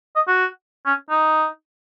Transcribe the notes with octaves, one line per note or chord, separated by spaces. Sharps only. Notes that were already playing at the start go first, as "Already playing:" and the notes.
D#5
F#4
C#4
D#4